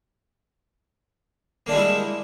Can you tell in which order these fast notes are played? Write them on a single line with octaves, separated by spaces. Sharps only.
A#3 D4 G#3 G3 E4